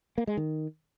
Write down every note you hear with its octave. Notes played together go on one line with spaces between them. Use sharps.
A#3
G#3
D#3